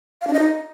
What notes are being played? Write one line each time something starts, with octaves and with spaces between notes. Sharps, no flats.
F5
D4
D#5
D#4